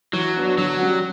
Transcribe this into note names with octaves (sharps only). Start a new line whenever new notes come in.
E3 F#3
B3 D4 F#4
D3 F#3
G3 C#4 F#4